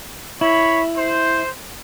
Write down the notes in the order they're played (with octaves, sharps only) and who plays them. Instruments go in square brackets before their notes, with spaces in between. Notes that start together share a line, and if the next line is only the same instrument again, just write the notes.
[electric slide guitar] E4 [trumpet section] C#5 B5
[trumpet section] C5